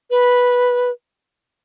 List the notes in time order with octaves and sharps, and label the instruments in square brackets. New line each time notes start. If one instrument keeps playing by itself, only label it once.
[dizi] B4